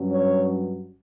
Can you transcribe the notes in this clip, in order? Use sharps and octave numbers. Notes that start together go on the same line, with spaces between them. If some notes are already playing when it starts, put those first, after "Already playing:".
Already playing: G2 F#3 C#4
C#5